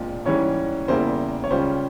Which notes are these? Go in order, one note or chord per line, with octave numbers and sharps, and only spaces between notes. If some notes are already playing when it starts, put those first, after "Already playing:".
Already playing: A#1 A#2 G#3 C4 F4
G#2 E3 G3 C#4 C#5
E2 C#3 G3 A#3 E4 C5
C#5
C#2 C#3 G3 C#4 F4 C5